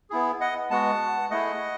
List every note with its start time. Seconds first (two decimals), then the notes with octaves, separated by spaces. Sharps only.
0.10 B3 E4 G#4
0.41 D#5 F#5
0.71 G#3 B3 F#4 F#5 A5
1.30 A3 E4 G#4 D#5 F#5